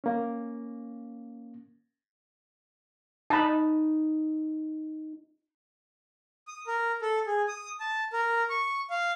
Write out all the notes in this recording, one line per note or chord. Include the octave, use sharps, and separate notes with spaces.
A#3 C#4
D#4 A5 B5
D#6
A#4
A4
G#4
D#6
A5
A#4
C#6
F5